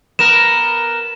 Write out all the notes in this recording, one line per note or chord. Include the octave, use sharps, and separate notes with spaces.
B3 A#4 E7